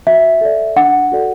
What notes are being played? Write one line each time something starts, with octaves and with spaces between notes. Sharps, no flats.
F#4 E5
A4 D5
D4 F#5
F#4 A4 D5